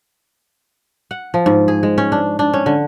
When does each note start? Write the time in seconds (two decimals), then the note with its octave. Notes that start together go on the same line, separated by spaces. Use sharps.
1.11 F#5
1.34 F3
1.46 G#2
1.68 G#4
1.83 G#3
1.98 C#4
2.12 D4
2.39 D4
2.54 C#4
2.66 D3